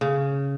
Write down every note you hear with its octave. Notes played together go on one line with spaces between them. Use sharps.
C#3